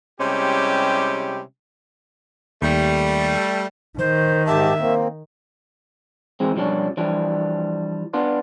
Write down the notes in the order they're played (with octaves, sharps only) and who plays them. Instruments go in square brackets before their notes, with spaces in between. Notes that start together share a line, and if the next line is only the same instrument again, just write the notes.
[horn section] C3 G3 G#3 C#4 E4 G4
[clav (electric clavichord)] D#2 [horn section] G3 A3
[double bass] D#3 [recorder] C5
[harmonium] G#2 G4 A5 [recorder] E5
[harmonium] A#3 C4
[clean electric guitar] E3 G#3 C4
B1 F3 G3 C#4 D4
E3 F3 G3 D4
B3 D4 F4